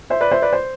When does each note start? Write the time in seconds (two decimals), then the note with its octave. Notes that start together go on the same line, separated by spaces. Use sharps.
0.10 C5 E5
0.21 B4 D5
0.31 C5 E5
0.42 B4 D5
0.53 C5